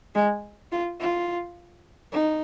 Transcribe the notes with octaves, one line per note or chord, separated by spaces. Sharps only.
G#3
F4
F4
D#4